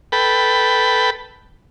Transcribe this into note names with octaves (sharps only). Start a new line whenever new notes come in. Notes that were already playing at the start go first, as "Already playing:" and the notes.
A4 B4 G5 B5